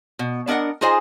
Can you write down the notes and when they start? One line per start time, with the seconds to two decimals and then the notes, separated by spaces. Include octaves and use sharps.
0.19 B2
0.47 B3 D4 A#4 D#5 F#5
0.81 D#4 F4 G#4 C5 D#5 G#5